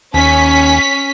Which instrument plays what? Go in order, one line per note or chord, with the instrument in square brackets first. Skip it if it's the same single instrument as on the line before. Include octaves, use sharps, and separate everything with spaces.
[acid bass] D#2 [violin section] C#4 B6 [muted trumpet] G#5